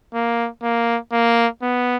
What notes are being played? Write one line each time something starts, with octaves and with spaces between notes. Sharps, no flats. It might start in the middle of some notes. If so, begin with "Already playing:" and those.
A#3
A#3
A#3
B3